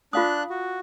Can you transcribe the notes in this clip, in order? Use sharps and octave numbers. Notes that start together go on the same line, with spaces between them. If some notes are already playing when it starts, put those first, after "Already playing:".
D4 F4 F5 D#6 F#6
F#4